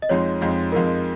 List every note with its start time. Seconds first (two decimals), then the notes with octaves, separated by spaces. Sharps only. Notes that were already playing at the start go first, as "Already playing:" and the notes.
0.02 D#5
0.09 F2 F3 G#3 D#4 C#5
0.41 F2 F3 G#3 D#4
0.72 F2 F3 G#3 D#4 A#4